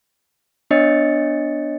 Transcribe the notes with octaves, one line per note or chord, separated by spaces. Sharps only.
B3 D4 C#5 D#5 A6 C#7